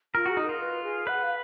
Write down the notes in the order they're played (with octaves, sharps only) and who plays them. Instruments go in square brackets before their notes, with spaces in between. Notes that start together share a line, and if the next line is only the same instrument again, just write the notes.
[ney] F4 [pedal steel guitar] A#4
[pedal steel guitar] F#4 [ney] G#4
[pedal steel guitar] D#4
[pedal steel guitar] F4 [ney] A#4
[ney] B4
G#4
[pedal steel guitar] B4 [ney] F#5
[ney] F5